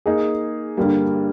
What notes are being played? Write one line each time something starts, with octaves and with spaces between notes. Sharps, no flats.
A#3 D#4 G#4
G2 D3 G3 A#3